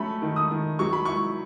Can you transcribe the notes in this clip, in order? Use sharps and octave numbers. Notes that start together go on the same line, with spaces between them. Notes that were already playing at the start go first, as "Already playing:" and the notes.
Already playing: F#3 A3 C#4 B5
D#3
D#6
D#3
F#3 C#6
B5
E4 C#6